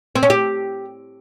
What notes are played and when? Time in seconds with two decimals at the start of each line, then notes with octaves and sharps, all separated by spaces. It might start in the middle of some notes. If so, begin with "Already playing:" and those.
0.15 C4
0.23 C#4
0.30 G4